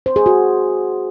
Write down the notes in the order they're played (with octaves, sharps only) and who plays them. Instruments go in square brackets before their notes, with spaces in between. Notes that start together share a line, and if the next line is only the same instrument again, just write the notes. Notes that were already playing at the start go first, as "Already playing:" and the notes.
[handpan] C5
G#4
F#4